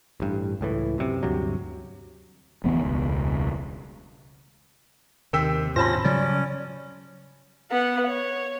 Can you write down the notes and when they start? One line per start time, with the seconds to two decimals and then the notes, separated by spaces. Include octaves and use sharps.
0.20 A1 G2
0.61 C#2 A2 E3
0.98 F#2 C3
1.23 D2 G2 C3 F#3
2.64 F1 D2 E3 B3
2.84 E1 C#2
5.33 D#2 C3 D#3 G5 E6 B6
5.76 G#2 C#4 F4 C5 A5 B5 A#6
6.05 C#3 F#3 G3 C#4 D5
7.71 B3 F#5
8.07 C#5